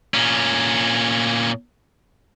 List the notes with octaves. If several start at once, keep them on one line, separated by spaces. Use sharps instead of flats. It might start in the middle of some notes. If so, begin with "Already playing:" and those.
A#2 C#4